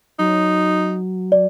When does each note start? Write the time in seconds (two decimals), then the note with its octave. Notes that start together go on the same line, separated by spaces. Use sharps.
0.19 F#3 D#4
1.32 D5